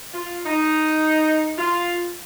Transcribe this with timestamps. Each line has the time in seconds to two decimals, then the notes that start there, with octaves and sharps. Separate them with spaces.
0.13 F4
0.45 D#4
1.57 F4